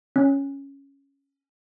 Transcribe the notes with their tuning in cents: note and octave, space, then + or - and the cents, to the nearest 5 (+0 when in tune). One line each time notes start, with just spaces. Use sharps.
C#4 +0